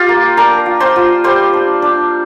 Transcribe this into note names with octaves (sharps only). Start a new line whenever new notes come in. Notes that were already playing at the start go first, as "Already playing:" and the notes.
Already playing: F4 G4 F5
A#3
D4 A#4 A#5
F4
C5 C6
F4
G3 C5 C6
D4
D4